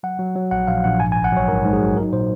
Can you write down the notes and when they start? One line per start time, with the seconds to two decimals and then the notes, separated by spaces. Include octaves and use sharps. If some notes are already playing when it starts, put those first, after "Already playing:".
0.03 F#3 F#5
0.19 F#3
0.36 F#3
0.51 A#1 F#5
0.67 A#1 F5
0.84 A#1 F#5
1.00 G#2 G#5
1.12 G#5
1.16 G#1
1.24 F#5
1.32 F#3 C#5
1.48 G#2 A#4
1.65 G#2
1.73 G#4
1.81 F#3
1.97 D#4 A#4
2.13 A#2 C5